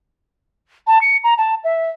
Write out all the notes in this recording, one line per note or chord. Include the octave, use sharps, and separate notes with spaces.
A5
C#7
A#5
A5
E5